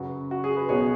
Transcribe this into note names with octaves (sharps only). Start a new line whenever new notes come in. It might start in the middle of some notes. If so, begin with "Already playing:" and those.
Already playing: F#2 C#3 F#3 F#4 B4
F#4
G#4
B4
B1 B2 B3 G#4 C#5